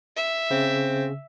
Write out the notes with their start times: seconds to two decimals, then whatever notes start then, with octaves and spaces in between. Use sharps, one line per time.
0.16 E5
0.50 C#3 C4